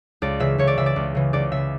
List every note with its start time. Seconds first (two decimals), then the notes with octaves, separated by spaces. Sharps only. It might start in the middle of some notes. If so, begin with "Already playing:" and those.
0.22 C#2 D5
0.40 C#3 E3 E5
0.58 C#2 C#5
0.67 D5
0.78 C#3 E3 E5
0.86 D5
0.96 C#2
1.15 C#3 E3
1.33 C#2 D5
1.52 C#3 E3 E5